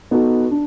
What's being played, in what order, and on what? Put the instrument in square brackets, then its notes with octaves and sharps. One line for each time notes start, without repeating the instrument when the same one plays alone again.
[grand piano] B3 D#4 F#4 A4
D4